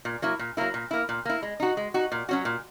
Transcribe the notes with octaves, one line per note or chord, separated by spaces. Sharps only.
A#2
F#3 A#3 E4
A#2
F#3 A#3 E4
A#2
A#3 E4
A#2
A#3 E4
G#3
D#4 F#4
G#3
D#4 F#4
A#2
F#3 C#4 F#4
A#2